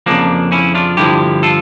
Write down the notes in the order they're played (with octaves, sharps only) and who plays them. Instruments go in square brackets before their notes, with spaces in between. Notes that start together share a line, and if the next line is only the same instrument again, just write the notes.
[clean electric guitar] F2 C#3 F3 A#3 D4
C#4 E4
D4 F4
G2 D3 F3 E4 G4
F4 A4